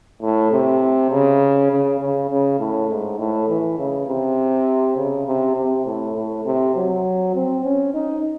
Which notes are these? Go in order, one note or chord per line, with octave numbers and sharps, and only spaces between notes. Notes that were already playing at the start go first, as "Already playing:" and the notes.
A2
C3
C#3
C#3
C#3
C#3
A2
G#2
A2
E3
C#3
C3
C#3
C3
C3
A2
A2
C3
F#3
C4
C#4
D#4